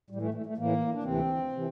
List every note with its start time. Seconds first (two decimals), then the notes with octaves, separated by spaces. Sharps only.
0.10 A2 G3
0.15 E3
0.22 A3
0.34 A3
0.46 A3
0.57 A2 E3 A#3
0.94 D4
1.03 D2 C3 E3 C4
1.52 C3 E3